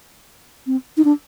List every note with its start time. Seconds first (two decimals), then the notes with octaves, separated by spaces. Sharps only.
0.67 C4
0.97 D#4
1.05 D4